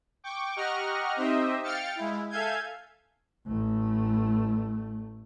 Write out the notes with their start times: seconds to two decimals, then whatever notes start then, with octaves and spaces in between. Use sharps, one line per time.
0.24 G5 C#6 D6
0.56 G4 D#5 F#5 A#5 C#6 F6
1.17 C4 D#4 G4 C5 D#5 E5
1.63 F5 G5 F6 A6 C#7
1.96 G#3 E4
2.30 A4 E5 F5 G#5 G6 G#6
3.47 A1 A3